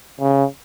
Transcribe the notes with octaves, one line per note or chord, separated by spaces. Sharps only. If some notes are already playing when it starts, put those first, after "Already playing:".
C#3